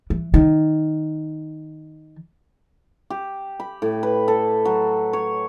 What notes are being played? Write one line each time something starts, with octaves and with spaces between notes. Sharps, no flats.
E3
D#3
G4
B5
A2
B4
A4
F#3
C#5